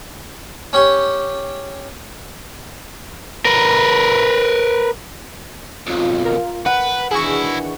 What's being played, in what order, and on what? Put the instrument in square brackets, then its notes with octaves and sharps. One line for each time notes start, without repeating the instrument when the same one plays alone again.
[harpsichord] C#4 G4 C#5
[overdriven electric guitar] A#4 B4
[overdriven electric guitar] B1 F2 [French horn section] F4
[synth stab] A#4
[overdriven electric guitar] B4 [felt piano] F#5
[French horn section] D#3 E3 D4 [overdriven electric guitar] E4 F#4 [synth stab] G#4 C#6